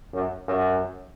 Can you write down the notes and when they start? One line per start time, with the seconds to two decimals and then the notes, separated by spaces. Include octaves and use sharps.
0.13 F#2
0.48 F#2